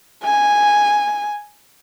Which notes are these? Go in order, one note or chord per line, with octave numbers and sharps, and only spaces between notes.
G#5